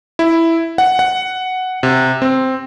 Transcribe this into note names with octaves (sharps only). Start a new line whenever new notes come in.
E4
F#5
F#5
C3
C4